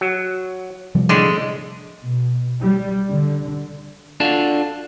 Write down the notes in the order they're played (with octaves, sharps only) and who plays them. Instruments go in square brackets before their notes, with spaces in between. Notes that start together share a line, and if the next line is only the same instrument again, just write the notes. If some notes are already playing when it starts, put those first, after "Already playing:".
[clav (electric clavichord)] F#3
[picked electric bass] C3 F3 G3
[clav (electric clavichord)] A2 D3 D4 [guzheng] G#3
[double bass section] B2
G3
D3
[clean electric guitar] D4 F4 F#4 A4